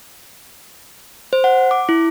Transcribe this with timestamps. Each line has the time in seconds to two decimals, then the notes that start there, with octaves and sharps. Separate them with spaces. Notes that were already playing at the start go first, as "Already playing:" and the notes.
1.33 C5
1.44 F#5
1.71 D6
1.89 E4